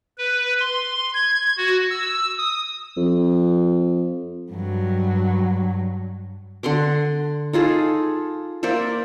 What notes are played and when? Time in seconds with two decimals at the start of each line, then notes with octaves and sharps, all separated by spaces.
0.18 B4
0.60 C6
1.13 G#6
1.57 F#4
1.90 E6
2.38 D#6
2.97 F2
4.52 G2 F#3
6.63 D3 F#5 C6 D6
7.53 D#4 F4 G#4 A4
8.63 A#3 C5 D5 E5